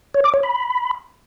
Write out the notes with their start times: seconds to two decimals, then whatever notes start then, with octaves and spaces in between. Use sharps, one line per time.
0.14 C#5
0.24 D6
0.34 C#5
0.43 B5